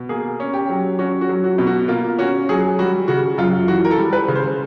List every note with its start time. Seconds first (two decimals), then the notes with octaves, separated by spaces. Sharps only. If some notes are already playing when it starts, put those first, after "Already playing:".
Already playing: B2
0.09 A#3 G#4
0.40 C#4
0.54 G4
0.70 F#3
0.99 C#4 F#4
1.21 F#4
1.29 F#3
1.44 F#4
1.58 B2
1.67 F#4
1.88 A#3 F4
2.19 C#4 F#4
2.49 F#3 G#4
2.79 G3 F#4
3.08 C#3 F#4
3.38 F#2 F4
3.68 E3 F#4
3.85 A#4
3.91 A4
3.97 G3
4.13 B4
4.28 C#3
4.36 C5